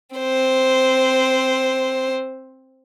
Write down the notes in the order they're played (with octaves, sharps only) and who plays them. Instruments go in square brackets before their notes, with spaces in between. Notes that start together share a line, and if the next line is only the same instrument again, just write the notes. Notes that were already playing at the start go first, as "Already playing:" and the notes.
[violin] C4 C5